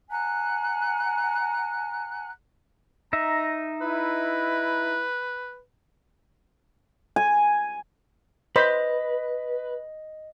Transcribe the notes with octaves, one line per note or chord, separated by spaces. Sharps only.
F#5 G#5 A#5 F#6
D#4 E5 A#5
E4 B4
G#5
B4 C5 D#5 B5